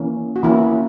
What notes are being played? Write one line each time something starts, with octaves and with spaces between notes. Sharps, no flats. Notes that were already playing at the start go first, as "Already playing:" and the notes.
Already playing: E3 A#3 C#4
F#4
E3 A#3 C#4 E4